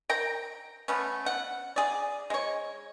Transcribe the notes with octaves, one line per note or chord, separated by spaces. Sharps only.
A#4 G5 A#5
A3 B3 C#4
F#5
G#4 D5
G#3 C#5